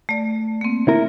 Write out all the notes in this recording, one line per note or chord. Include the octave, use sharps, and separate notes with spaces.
A3 D5
A#3 C4
E4 A#4